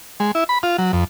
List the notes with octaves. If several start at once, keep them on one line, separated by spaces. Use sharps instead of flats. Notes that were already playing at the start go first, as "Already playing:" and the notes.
G#3
E4
B5
F4
F#3
F2